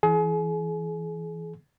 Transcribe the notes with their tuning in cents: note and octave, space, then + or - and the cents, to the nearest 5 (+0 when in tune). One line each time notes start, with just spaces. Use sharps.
E3 +0 G#4 +35